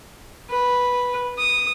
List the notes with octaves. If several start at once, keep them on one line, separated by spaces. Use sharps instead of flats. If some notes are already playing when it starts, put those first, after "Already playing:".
B4
D#6